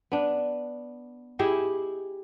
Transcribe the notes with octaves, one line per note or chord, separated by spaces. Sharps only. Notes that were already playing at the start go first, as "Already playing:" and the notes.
B3 D4
E4 G4 G#4 D#5